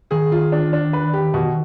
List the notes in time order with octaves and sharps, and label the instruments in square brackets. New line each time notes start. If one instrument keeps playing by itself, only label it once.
[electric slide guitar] D#3 [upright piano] G#4
[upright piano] F4
D4
D4
B4
G4
B2